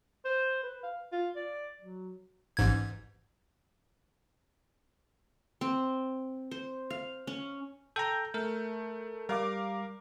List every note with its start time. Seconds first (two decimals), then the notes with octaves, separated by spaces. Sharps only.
0.25 C5
0.63 B4
0.83 F5
1.12 F4
1.36 D5
1.81 F#3
2.57 A1 G#2 G#6
5.61 C4
6.51 C5
6.90 F5
7.27 C#4
7.96 A4 G5 A#5 G6
8.34 A3 A#4
9.29 G3 A#4 F5 D6